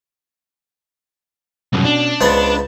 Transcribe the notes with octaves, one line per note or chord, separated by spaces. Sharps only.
C2 F#2 B2 C#4
D4
C#2 B3 C5 F#5 A6